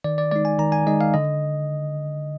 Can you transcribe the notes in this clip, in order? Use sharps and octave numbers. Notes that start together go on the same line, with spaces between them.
D#3 D5
D5
G#3 D#4 D5
G#5
D#3 A#5
G#5
G#3 D#4 D#5
F5
D3 D#5